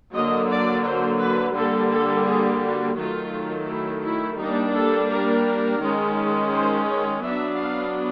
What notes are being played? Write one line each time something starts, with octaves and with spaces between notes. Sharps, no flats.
D3 F#3 A#3 D#5
D5
C5
B4
D3 G3 A#3 A4
A4
G#4
F#4
D#3 F#3 A3 F4
E4
E4
G3 A#3 D4 D#4
A4
A#4
D#3 G#3 C#4
C5
C#5
F#3 B3 D4 E5
F5